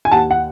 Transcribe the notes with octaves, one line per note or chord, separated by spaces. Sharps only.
G#5
D#2 F#5 A5
F#5